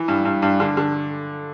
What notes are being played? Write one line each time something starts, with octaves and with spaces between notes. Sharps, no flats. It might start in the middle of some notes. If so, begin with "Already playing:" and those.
Already playing: E3
G2
G2
G2
D3
D3